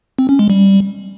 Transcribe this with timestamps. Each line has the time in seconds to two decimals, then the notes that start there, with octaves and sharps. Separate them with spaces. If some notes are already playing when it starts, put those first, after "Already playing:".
0.19 C4
0.29 C#4
0.39 G#3
0.50 G3